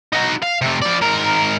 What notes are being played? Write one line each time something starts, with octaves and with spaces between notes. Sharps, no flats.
D#4 F#4
F5
C3 A3
F3 D5
G#2 A#4